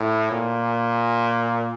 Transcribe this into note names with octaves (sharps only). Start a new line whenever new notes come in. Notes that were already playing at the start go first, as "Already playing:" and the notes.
Already playing: A2
A#2